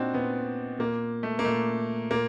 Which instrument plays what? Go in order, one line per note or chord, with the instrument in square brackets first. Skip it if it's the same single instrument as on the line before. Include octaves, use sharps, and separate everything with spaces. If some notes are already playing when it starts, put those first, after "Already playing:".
Already playing: [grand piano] A#2 C4 D4 D#4 F#4
A#2 B3
A#2 A#3
A3
A#3
A#2 A3
A#2 A#3